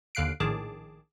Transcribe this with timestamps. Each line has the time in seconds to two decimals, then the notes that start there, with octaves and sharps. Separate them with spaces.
0.15 D#2 D3 F5 F#6 C7 D7
0.40 A#1 A2 D#3 G#4 A5 D6